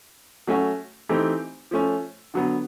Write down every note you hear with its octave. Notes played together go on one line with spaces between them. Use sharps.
F#3 A3 C#4 F#4
E3 A3 C4 D#4 G4
F3 A3 C#4
D3 F#3 B3